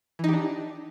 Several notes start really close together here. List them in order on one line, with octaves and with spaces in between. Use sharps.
E3 D#4 G4 D4